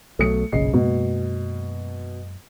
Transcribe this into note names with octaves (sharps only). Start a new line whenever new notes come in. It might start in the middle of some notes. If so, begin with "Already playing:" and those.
B1 B2 F#3 A3 D#6 C#7
F#1 B1 A#2 C#3 D#5 C7
F#2 B2 G#3 A#3